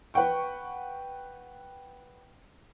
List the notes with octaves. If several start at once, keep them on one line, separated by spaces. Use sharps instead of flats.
B4 F#5 G5 C#6